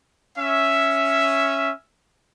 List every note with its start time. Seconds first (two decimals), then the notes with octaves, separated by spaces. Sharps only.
0.38 C#4 E5